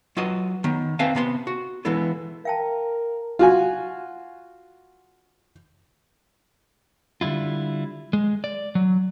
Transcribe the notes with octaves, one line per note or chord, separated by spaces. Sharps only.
F#3 F4 F#4 B4 D#5
D#3 B3
C4 B4 E5 F5 G#5 A5
C3 B3 E5 C6
F#4
E3 G#3 B3 E4 A4
A#4 F5 G5 A5
F4 F#4 G#5
D3 G3 E4 F4
G#3
D5
F#3